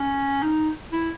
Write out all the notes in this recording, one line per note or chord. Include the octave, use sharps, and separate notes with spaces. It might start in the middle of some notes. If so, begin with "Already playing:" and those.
Already playing: C#4
D#4
E4